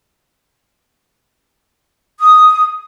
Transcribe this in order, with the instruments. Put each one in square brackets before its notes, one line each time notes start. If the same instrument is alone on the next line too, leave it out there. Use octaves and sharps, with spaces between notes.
[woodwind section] D#6